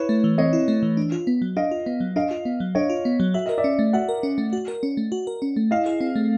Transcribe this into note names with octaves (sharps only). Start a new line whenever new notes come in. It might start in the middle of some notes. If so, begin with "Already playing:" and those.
Already playing: E4 B4 C#5
A3
E3
C4 C#5 D#5
E4
A3
E3
D4
F4
B3
F#3
D4 D#5 F5
F4
B3
F#3
D4 D#5 F5
F4
B3
F#3
D4 C#5 D#5
F4
B3
F#3
F#4 E5
A#4 D#5
D5 E5
C#4
A3
F#4 E5 F#5
A#4
C#4
A3
F#4
A#4
C#4
A3
F#4
A#4
C#4
A3
E4 D#5 F5
G#4
C4
A3